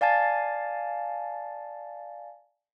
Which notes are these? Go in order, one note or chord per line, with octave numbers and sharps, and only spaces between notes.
D5 F5 G#5 A5 A6